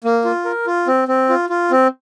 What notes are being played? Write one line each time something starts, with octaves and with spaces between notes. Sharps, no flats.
A#3
F4
A#4
F4
C4
C4
F4
F4
C4